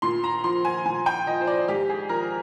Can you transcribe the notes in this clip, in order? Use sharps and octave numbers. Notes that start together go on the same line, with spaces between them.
A#2 C6
A#5
F3 C6
G#5
A#2 G#5
G5
F3 D#5
C5
D5
G#2 G4
G#4
F3 A#4